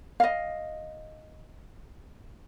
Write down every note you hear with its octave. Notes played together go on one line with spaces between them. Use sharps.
D#5 F5